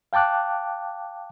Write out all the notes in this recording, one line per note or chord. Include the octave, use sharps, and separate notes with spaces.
F5 G5 A5 D6 F#6